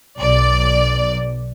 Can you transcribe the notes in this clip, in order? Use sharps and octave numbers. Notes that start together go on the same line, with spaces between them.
B1 D5